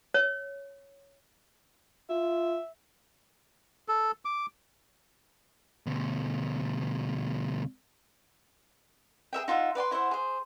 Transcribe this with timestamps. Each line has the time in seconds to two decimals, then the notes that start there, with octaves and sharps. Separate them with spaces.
0.14 C#5
2.10 F4 E5
3.88 A4
4.25 D6
5.87 D2 B2
9.33 G#4 A#4 E5 G5
9.48 D#4 F4 E5 F#5
9.75 B4 D5 G5 C6
9.91 E4 C5 E5 F#5
10.11 G#4 C5